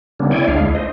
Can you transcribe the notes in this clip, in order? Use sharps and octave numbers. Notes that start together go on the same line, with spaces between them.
C#3 G3 A#3 B3 C#4 D4
E4 C#5 D5 G5 G#5
D2 G#3 D4 F5
E4
C5 D#5